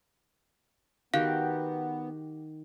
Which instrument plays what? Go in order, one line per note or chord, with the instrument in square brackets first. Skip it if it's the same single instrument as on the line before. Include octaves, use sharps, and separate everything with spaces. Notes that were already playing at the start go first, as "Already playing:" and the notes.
[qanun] D#3 F#4 G4 [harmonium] B3 [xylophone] F5